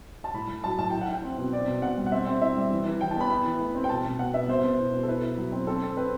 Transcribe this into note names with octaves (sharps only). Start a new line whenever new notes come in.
A5
A2 B5
A2
F#3 A5
A2 A5
E4 G5
F#5
E4 G5
C4
B2
C4 D5
B2
B2 F#5
G3
F#5
C4 E5
C4
E4 E5
G3
E3
E3
E3 G5
A5
B3 B5
E4 B5
E3
A3
C4
G5
B2 A5
B2
B2 F#5
B3 E5
B2 C5
B2
E4
B2
A4
E4 B4
E4
F#3
C4
C4 A4
C4
C4 B4